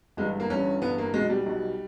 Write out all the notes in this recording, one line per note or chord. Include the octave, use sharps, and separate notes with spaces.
G1 G2 E3 G#3
A#3
G1 G2 E3 C#4
G1 G2 E3 B3
A#3
B1 B2 G#3
G3
B1 B2